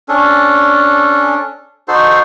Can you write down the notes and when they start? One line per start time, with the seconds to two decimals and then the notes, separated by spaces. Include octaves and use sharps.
0.09 C#4 D4 A4
1.88 D#4 F#4 A4 C5